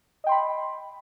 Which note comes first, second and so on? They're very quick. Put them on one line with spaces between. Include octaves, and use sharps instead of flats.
D#5 G5 C6 B5